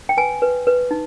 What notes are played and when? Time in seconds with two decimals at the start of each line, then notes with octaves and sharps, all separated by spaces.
0.09 G5
0.17 B4 G#5
0.42 B4
0.67 B4
0.91 D#4